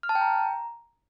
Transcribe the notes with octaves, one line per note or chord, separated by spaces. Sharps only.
F6
A5
G5
A#5